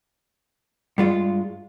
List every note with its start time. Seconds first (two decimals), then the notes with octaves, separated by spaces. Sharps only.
0.98 G2 G#3 F4